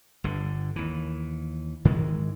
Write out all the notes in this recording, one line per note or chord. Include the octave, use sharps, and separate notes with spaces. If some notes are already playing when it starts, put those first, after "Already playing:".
G1 D3
D#2 E3
G#2 D#3 E3 G#3